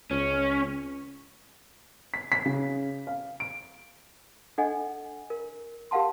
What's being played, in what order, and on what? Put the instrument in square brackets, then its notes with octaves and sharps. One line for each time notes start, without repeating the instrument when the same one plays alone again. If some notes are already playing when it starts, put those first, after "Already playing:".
[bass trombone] C#2 [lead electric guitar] C#4
[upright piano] B6
B6
C#3
F5
D7
[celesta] D4 A4 D#5 F#5 G#5
A#4
G4 A#4 F5 F#5 A5 C6